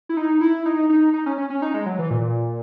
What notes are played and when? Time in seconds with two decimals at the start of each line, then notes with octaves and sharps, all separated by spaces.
0.09 E4
0.17 D#4
0.41 E4
0.66 D#4
0.90 D#4
1.14 D#4
1.26 C#4
1.38 C#4
1.50 C#4
1.62 D#4
1.74 G#3
1.86 F#3
1.99 E3
2.11 A#2